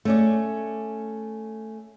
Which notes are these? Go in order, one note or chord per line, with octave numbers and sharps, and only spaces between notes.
A3 C#4 D5